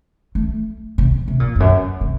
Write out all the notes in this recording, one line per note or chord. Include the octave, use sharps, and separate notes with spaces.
A3
C3
C3
A#2
F2
F#2
C3